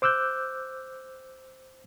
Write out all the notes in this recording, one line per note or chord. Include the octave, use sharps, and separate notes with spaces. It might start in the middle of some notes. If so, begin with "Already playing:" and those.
C5 D6 E6 F#6 G6